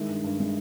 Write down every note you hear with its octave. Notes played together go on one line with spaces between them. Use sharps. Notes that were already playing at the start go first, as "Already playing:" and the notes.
Already playing: D#3 G#3 E4 E5
G2
G2
G#3